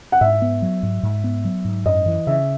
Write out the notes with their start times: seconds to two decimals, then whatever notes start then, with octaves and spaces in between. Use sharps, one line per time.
0.12 F#5
0.21 G#2 E5
0.42 B3
0.62 F#3
0.83 G#2
1.03 G#2
1.24 B3
1.45 F#3
1.65 G#2
1.85 F#2 D#5
2.06 E3
2.27 C#3 E5